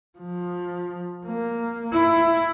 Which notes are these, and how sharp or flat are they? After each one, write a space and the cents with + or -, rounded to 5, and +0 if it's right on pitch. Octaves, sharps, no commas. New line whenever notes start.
F3 +20
A#3 +0
E4 +15